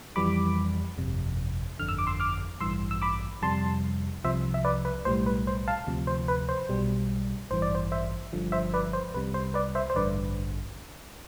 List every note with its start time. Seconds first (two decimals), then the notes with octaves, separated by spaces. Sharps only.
0.16 F2 E3 G3 B5 D6
0.98 G1 F2 C3
1.79 G1 F2 D3 F6
1.89 E6
1.99 D6
2.07 C6 E6
2.20 D6 F6
2.60 A1 G2 E3 C6 E6
2.91 E6
3.02 B5 D6
3.42 F2 C3 G3 A5 C6
4.24 C2 C3 F3 C5 E5
4.54 E5
4.64 B4 D5
4.85 B4
5.05 B1 A2 G3 C5
5.26 B4
5.47 C5
5.68 F5 A5
5.87 D2 C3 F3
6.07 C5
6.28 B4
6.49 C5
6.69 B1 B2 G3
7.51 A1 G2 E3 C5
7.62 D5
7.75 C5
7.92 C5 E5
8.33 G1 G2 D3 F3
8.52 C5 E5
8.74 B4 D5
8.93 C5
9.14 C2 C3 G3 B4
9.34 C5
9.54 B4 D5
9.75 C5 E5
9.90 C5
9.95 A1 G2 D3 B4 D5